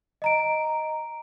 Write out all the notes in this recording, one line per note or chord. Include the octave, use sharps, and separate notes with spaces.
D#5 A#5 D7